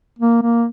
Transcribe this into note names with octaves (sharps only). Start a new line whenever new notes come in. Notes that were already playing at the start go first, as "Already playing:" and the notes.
A#3
A#3